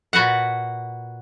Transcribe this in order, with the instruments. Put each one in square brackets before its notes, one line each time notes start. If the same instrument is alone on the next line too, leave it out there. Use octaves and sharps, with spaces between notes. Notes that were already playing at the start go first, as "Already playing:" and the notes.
[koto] A#2 F#4 B4 F#5